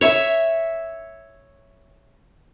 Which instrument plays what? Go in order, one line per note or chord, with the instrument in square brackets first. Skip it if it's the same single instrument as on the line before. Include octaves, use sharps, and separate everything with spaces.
[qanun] C#5 E5